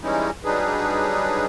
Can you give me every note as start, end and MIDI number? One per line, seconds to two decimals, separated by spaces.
0.01 0.30 52
0.01 0.30 55
0.01 0.30 56
0.01 0.30 61
0.01 0.30 63
0.01 0.30 64
0.44 1.46 54
0.44 1.46 55
0.44 1.46 62
0.44 1.46 63
0.44 1.46 68
0.44 1.46 71